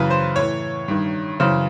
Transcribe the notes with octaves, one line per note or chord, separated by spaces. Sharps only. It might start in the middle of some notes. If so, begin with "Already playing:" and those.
Already playing: F#2 C#3 E3 B4
C5
A2 E3 C#5
G2 D#3
F#2 C#3 E3 C5